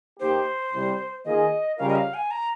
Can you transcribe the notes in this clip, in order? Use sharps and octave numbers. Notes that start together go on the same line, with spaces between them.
D#2 D#3 A#3 D#4 G4 C5
C2 C3 G3
D#3 A#3 F4 G#4 D#5
C#3 G3 C#4 F4 A#4 F5
D#5
F5
G#5
A#5